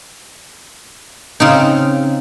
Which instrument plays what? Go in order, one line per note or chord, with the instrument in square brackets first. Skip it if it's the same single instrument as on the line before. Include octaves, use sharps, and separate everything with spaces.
[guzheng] C#3 C4 D#4